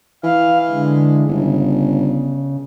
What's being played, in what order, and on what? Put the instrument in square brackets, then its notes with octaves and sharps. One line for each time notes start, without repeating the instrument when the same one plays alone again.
[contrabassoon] E3 [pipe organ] F5
[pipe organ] D3 G#3
[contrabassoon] G1 [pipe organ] C#3